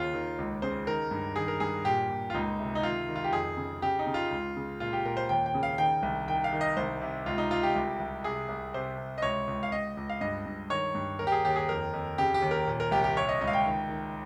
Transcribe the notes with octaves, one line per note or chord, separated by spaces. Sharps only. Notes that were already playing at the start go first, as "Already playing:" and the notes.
Already playing: D#2 C#3 F4
D#3
C#2
C#3 C5
D#3 A#4
G2
D#3 G#4
A#4
G2 G#4
A#2 G4
A#2
F4
C#2 D#4
C3
D#4
D#3 F4
D#3
F4
G4
F2 G#4
C#3
C#3 G4
D#4
C#3
F4
C#2
C#3
A#2 F4
G4
A#2 A#4
C5
D#2 G5
G5
C#3
F5
D#3 G5
C2
D#3 G5
F5
D#3
D#5
C2 C5
C3
C#2 F4
D#4
C#2 F4
G4
C2
C2
C3 G#4
C2
C3 C5
C3
D#5
C#2 C#5
C#2
F5
C#2 D#5
C#2
F5
G2 D#5
G2
D#3 C#5
G2
D#2 A#4
G4
G#4
D#2 G4
G#4
F2 A#4
F2
C#3 G4
G4
D#2
A#4
A#2
A#4
C2 G4
G4
C3 C#5
D#5
C#2 D#5
F5
G5
D#3
D#3